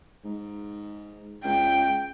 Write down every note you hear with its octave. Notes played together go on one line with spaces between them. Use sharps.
G#2
C#2 G5